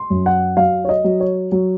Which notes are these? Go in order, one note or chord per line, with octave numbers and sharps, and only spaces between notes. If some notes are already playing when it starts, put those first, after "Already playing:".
Already playing: C6
F#2
F#5
F#3 F5
C#5
D#5
F#3
C#5
F#3